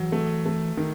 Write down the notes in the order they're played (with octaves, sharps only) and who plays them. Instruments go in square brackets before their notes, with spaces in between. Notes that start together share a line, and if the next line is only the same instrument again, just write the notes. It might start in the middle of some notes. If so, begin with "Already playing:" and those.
Already playing: [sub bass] E3 [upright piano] F#3
[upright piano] A3
A3
D#3